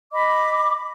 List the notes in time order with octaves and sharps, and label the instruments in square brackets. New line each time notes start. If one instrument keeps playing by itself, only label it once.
[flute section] D#5 B5 D6